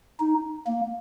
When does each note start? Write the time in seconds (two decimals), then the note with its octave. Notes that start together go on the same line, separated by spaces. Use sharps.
0.20 D#4
0.67 A#3